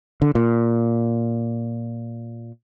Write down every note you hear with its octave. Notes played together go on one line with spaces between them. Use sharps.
D3
A#2